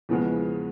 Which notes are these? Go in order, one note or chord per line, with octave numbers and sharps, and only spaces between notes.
E2 C#3 F3 G#3 B3